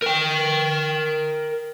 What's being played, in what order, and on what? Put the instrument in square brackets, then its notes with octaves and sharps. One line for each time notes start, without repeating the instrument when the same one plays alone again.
[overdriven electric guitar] A#4 G5